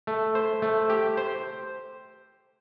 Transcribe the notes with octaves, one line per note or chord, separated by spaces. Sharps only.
A3
C5
A3
G4
C5